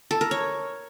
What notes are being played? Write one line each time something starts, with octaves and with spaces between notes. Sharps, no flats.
A4
A#4
C#5